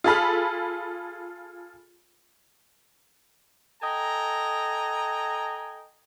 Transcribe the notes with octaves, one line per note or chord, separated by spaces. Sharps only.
F4 G#4 A4 B5 F6
A4 D#5 G5 G#5 A#5